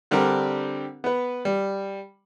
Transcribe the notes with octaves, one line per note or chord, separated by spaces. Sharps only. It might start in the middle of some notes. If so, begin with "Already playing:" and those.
D3 G3 C4 D4 G4 A#4
B3 B4
G3